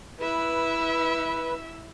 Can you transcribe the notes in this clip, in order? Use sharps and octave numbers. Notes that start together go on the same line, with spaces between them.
E4 B4 E5